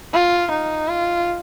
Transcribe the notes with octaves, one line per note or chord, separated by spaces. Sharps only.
F4
D#4
F4